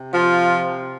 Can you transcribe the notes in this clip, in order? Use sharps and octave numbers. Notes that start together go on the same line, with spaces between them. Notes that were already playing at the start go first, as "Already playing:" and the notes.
Already playing: C3
F3 F4